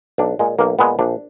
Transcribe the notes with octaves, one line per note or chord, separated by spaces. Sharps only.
B1 D4
A#2 G#3
B1 A#3
A#2 G#3 B3
A#1 D4